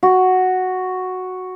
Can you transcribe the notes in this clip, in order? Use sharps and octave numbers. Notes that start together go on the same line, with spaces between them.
F#4